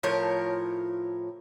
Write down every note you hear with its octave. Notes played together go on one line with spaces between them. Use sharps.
A2 F3 A#4 C#5